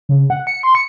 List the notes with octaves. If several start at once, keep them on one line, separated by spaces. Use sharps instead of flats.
C#3
F#5
C#7
C6
C#7